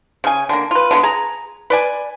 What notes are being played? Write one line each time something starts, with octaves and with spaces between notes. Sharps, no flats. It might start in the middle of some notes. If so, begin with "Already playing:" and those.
C#3 G#5
D3 A#3
F4 B4
D3 G#3 B3
G#4 A#5
B4 D5 G#5